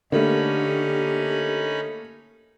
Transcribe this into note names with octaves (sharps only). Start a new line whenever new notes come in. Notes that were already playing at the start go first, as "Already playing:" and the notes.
D3 A3 A#3 C#4 D#4 G4 B5